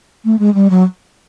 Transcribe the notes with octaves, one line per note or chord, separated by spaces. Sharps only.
A3
G#3
G3
F#3